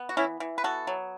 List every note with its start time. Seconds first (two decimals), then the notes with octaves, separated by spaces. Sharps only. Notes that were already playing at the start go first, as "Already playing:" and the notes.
Already playing: B3
0.09 F#4
0.17 E3 C#4 E4
0.40 E3
0.58 B4
0.64 B3 F#4 A4
0.87 F#3